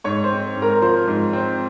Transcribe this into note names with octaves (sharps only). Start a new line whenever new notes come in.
G#2 C#5 C#6
C5 C6
C4
G#2
A#4 A#5
F3 C5 C6
G#2
C4